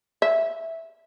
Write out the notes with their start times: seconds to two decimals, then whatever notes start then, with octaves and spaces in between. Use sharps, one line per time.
0.22 E5